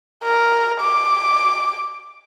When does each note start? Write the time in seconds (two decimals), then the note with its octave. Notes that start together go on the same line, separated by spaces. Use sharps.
0.24 A#4
0.80 D6